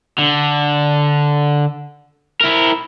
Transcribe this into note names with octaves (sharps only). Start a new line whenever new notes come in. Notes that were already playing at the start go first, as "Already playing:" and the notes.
D3
E4 A#4